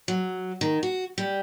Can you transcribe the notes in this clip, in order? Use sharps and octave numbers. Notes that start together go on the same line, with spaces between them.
F#3
D#3
F#4
G3